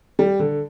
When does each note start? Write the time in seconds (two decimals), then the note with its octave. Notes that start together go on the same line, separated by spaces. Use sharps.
0.19 G3
0.39 D3